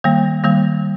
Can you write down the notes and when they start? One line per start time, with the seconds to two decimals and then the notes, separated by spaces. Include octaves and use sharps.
0.04 D#3 G3 A#3
0.44 D#3 G3 A#3